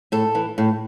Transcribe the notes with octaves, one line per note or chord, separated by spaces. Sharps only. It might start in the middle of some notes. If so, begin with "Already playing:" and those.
A2 A4
E3
A2